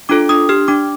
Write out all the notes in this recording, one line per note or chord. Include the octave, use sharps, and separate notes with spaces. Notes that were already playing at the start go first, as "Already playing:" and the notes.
D4 F4 A4 D6
D4 D#6
G4 F6
D4 D6